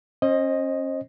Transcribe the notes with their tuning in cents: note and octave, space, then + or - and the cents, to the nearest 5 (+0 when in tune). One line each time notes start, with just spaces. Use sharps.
C#4 -35 C5 +30 D#5 +0